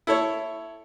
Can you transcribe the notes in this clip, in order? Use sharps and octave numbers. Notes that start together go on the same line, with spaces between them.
E4 A4 C#5